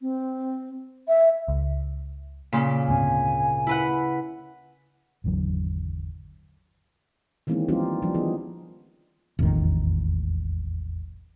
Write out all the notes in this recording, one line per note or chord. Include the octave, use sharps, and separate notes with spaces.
C4
E5
C#2
A#2 C#3
D2 G#2 C4 G#5
E4 B4 F#5
G#1 E2 D3 F#3
D#3 E3 G#3 A#3 C4 C#4
F3 G3 C4 D#4 F4 G4
D#3 F3 G3 D4
E3 B3 D#4 G#4
E1 A1 F2 D#3